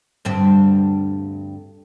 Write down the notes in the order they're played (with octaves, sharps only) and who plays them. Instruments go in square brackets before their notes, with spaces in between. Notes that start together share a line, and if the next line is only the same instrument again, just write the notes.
[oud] D2 G2 C4